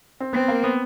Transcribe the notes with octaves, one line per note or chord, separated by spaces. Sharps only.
C4
B3 C4
A#3
B3